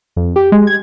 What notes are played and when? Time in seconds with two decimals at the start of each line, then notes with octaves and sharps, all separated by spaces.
0.16 F2
0.36 G4
0.52 G#3
0.67 G#6